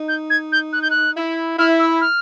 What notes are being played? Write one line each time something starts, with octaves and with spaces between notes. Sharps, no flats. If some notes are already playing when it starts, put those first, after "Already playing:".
Already playing: D#4
G6
G#6
G6
F#6
G6
F#6
E4
E4 F6
E6
F6